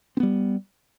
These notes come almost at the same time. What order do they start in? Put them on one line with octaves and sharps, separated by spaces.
C4 B3 G3